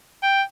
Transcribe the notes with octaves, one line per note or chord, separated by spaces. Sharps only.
G5